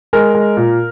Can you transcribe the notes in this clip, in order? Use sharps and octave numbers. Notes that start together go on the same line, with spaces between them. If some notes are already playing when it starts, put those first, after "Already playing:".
G#3 A#4
G#3
A#2